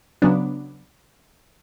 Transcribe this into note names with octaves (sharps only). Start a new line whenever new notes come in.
C#3 F#3 B3 D4